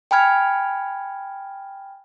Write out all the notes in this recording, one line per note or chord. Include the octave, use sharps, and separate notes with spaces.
G5 G#5 B5 F6 G#6